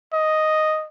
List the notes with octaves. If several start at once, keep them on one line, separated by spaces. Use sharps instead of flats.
D#5